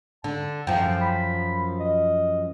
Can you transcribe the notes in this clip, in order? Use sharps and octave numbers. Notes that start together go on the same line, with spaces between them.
D3 A5
F#2 F3 G5
B5
D#5